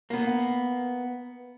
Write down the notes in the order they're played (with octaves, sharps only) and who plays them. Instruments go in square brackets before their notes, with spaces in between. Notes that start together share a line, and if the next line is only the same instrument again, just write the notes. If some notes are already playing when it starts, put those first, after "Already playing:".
[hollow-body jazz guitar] A#3 B3